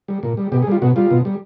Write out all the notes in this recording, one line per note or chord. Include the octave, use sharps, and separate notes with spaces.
G3
A#2
G3
B2 G4
G#4
G3 F4
B2 F#4
G3 F4
B2
G3